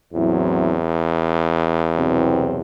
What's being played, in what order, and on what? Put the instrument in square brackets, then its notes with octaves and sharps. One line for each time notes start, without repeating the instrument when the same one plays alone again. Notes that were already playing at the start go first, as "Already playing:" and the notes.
[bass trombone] E2 [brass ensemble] A2 F#3 C4 E4
[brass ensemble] C2 B2 F#3 C4